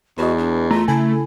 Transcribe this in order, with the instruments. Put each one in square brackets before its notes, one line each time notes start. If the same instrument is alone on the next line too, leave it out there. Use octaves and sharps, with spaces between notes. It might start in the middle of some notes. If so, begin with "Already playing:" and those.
[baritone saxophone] E2 [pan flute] F#4 [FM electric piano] B4 D#5
[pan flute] D4
[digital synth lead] A3 [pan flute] F4 [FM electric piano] A#5
[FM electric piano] C#3 A4 G#5 [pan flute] E4